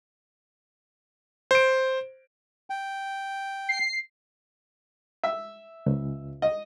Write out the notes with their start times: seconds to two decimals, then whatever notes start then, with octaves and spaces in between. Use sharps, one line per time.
1.51 C5 D7
2.70 G5
3.69 C7
5.24 E5
5.86 C#2
6.42 D#5